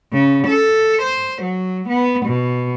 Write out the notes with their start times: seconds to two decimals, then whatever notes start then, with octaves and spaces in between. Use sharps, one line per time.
0.12 C#3
0.47 A4
1.02 C5
1.42 F#3
1.89 B3
2.26 B2